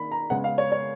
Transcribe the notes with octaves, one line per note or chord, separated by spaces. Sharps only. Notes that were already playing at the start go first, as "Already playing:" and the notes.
Already playing: D#3 A#3 B5
A#5
C#3 G#3 B3 F#5
F5
C#5
C#5